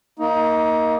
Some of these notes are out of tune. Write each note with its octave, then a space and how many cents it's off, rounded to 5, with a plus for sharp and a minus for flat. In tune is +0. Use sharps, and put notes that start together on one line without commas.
A#3 +0 D#4 +25